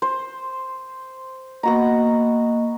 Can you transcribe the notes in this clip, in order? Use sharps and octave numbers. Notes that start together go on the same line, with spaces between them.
C5
A#3 B3 F#4 D#5 A#5